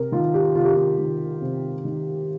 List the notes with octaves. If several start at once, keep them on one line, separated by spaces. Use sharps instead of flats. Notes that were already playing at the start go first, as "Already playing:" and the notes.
Already playing: C3 A#4
D#3 F4
G4
C3 F4
G4
F4
D#3
C3
D#3